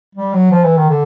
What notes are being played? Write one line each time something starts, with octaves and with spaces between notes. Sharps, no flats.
G3
F#3
F3
E3
D#3
D3